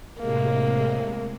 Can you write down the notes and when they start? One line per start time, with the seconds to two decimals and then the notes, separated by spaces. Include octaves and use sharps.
0.20 A2 C3 G#3 A#3